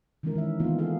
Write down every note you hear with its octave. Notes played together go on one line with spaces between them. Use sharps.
D#3 E3 G#3 C#4 E4 A#4
D#3 E5
D#3 E3 A#3 B3 D#4 F4
D#4 G#4 A4 F5